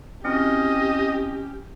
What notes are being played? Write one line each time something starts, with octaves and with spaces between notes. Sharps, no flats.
C4 C#4 E4 F#4 G4 D#5